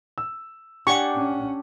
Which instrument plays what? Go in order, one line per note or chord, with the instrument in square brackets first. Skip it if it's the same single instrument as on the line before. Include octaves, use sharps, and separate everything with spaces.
[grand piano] E6
[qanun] D4 G4 [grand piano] F#5 G#5 [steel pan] C#6
[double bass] C#4